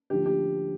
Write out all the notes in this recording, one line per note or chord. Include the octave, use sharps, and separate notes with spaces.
D2 D3 F3 G4
G4